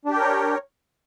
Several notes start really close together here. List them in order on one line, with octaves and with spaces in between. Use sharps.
D4 G4 G5 A#4 C#5